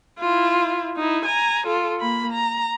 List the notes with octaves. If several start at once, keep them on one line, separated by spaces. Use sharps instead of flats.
E4 F4
D#4 E4
G#5 A#5
F4 A4
A#3 B5
A#5